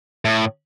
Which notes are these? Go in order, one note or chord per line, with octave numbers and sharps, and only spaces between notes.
A2